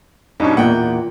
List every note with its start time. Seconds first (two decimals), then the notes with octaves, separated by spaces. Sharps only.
0.40 G2 B2 C#4 D#4
0.57 E2 A#2 F#5 G5